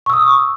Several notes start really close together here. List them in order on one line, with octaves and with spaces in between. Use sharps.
C#6 E6 D#6